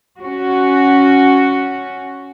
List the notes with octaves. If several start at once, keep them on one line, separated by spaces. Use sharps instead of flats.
C#4 F#4